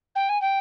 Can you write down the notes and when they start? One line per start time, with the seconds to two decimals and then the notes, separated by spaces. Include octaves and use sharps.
0.15 G5
0.29 G#5
0.41 G5